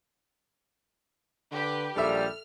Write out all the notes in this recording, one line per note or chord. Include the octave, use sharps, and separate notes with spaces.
D3 G4 B4
A#1 G3 A4 E5 F6